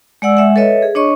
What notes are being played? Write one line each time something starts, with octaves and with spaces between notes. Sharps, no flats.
G#3 D5 F#5 E6
G#3 E5 F#5
A4 B4 C#5 D#5 E5
G#4
D4 C#5 D#5 C#6